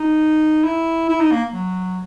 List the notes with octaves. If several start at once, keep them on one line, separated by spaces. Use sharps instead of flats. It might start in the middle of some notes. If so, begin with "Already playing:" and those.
Already playing: D#4
E4
E4
D#4
A#3
F#3